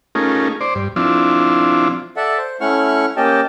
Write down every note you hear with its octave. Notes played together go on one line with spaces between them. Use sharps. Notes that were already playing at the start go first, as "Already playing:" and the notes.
A3 C#4 D#4 F4 G#4 A#4
C5 D5
G2
F3 C4 D4 E4 F4
A4 D5 E5 F#5
C5
A3 C#4 E4 F#5 C#6 F6
A#3 C#4 G4 D#5 G5 A5